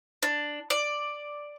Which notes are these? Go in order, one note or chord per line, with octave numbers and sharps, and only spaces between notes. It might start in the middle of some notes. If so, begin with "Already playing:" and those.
D4
D5